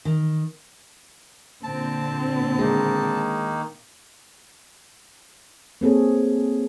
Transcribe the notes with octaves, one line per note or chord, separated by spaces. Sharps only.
D#3
A#2 D3 C4 A5
D#3 G#3 A#3 D#4
A#3 C4 G#4 A4 C#5